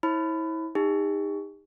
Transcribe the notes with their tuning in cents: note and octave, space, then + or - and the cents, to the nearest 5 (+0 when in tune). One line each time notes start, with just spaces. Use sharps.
E4 -30 C#5 -45 B5 +20
D#4 +0 G4 +45